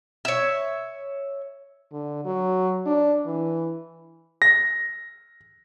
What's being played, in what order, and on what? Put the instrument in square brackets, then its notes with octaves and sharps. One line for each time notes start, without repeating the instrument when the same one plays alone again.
[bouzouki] C#5 E5
[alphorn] D3
F#3
D4
E3
[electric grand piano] A#6